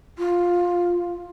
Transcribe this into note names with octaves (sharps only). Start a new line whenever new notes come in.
F4